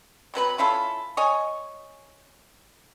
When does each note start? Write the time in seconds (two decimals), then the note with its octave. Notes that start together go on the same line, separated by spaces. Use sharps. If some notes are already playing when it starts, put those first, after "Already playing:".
0.34 C3 F#3 B4 B5
0.58 C#4 E4 F4 A4
1.17 C#5 D#5 G#5